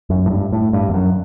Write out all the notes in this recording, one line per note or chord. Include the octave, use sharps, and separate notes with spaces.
F#2
A2
G2
A2
G2
E2
F#2